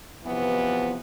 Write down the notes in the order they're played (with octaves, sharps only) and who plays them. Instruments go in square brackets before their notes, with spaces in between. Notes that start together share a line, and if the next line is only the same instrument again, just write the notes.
[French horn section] E2 C3 E3 F3 B3